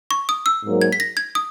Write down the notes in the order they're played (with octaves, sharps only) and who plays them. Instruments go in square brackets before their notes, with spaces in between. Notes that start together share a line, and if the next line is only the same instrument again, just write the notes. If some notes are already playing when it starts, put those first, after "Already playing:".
[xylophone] C#6
D#6
E6
[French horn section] G#2 F#3 A#3
[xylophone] G#6
B6
A#6
G#6
D#6